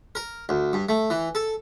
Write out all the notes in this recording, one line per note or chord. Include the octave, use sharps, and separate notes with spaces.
A#4
D2
G2
A3
E3
A4